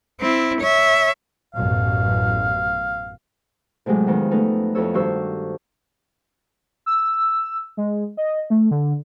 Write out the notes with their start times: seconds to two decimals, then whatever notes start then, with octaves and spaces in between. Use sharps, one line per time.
0.20 C4 E4
0.60 C#5 E5
1.55 A1 F#2 B2 F5
3.86 A2 C3 F#3 G#3
4.07 F2 D#3 B3
4.31 A3 B3 C#4 D#4 A4
4.75 F2 E4 A4 C#5 E6
4.94 G2 D#3 F#4 C5 C#6 E6
6.86 E6
7.77 G#3
8.17 D#5
8.50 A3
8.71 D3